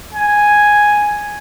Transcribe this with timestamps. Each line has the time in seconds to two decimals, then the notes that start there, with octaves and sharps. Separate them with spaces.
0.14 G#5